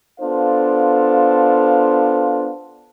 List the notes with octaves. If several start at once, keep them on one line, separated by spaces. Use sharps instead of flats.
B3 D4 F4 A4 C5 F5